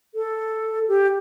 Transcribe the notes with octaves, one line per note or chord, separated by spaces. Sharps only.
A4
G4